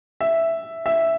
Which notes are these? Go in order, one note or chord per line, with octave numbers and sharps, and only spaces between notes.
E5
E5